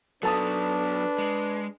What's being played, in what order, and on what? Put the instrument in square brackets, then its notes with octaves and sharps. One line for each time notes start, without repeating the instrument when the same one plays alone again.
[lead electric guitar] F#3 B3 [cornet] D4 [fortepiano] A4 A5 D#6 [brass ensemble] B4
[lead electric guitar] G#3